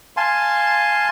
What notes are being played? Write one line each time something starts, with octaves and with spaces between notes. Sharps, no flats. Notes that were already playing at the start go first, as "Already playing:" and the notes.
F5 G#5 A5 C6